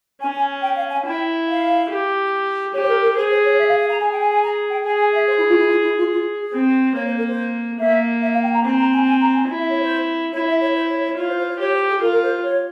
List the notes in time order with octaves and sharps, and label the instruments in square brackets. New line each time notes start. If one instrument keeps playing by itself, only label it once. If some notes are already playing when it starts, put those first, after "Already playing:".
[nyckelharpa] C#4 [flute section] G#5
[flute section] G#5
G5
F5
G#5
[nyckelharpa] E4 [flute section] G5
[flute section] F5
[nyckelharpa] G4
[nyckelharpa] G4 [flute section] C#5
[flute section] C5
A#4
A#4
[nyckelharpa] G#4 [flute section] C5
[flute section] C5
C#5
E5
F5
F5
A#5
[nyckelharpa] G#4 [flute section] G#5
[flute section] G5
G#5
G#5
A#5
G5
[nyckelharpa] G#4 [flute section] G#5
[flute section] G#5
E5
C5
E4
F4
E4
F4
E4
F4
F4
G#4
[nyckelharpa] C4
[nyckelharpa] A#3 [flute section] C#5
[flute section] C5
A#4
C5
[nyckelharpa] A#3 [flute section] E5
[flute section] E5
F5
G5
A#5
[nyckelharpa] C4 [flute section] G#5
[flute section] A#5
G#5
G#5
A#5
G#5
[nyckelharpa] E4
[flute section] E5
C#5
C5
[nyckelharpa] E4 [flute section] C#5
[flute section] E5
C#5
C5
C#5
C#5
[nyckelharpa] F4 [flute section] C#5
[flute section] C5
C5
C#5
[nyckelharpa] G4 [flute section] C#5
[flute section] C5
G#4
[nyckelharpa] F4 [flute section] A#4
[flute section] A#4
C5
C#5